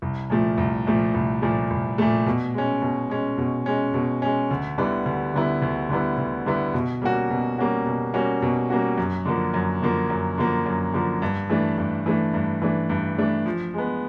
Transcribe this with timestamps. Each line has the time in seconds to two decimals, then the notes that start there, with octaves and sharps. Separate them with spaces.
0.02 C2
0.30 A#2 F3 A3
0.58 C2
0.86 A#2 F3 A3
1.14 C2
1.42 A#2 F3 A3
1.70 C2
1.98 A#2 F3 A3
2.26 B2
2.54 G#3 C#4
2.82 B2
3.10 G#3 C#4
3.38 B2
3.66 G#3 C#4
3.94 B2
4.22 G#3 C#4
4.51 D2
4.78 D3 G3 B3 E4
5.06 D2
5.34 D3 G3 B3 E4
5.62 D2
5.90 D3 G3 B3 E4
6.18 D2
6.46 D3 G3 B3 E4
6.74 B2
7.02 G3 A#3 C#4 F#4
7.30 B2
7.58 G3 A#3 C#4 F#4
7.86 B2
8.14 G3 A#3 C#4 F#4
8.42 B2
8.70 G3 A#3 C#4 F#4
8.98 F#2
9.25 D3 F3 A#3
9.54 F#2
9.82 D3 F3 A#3
10.10 F#2
10.38 D3 F3 A#3
10.66 F#2
10.94 D3 F3 A#3
11.22 G2
11.50 E3 A3 D4
11.78 G2
12.06 E3 A3 D4
12.34 G2
12.62 E3 A3 D4
12.90 G2
13.18 E3 A3 D4
13.46 F3
13.74 G#3 B3